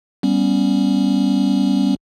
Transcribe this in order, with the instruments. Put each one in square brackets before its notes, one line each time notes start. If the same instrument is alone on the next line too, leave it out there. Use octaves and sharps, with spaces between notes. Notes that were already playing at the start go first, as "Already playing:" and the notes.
[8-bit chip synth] G3 B3 C#4